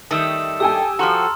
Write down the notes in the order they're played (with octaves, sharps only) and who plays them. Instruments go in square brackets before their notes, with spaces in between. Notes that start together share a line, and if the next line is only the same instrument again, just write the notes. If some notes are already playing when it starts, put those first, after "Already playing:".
[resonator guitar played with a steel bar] D#3 G3 A3 [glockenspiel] D#6 E6 E7
[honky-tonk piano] G4 G5 G#5 [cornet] A4 [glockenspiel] E6
[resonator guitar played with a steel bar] F3 F#4 [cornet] A4 [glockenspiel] A#5 C6 F6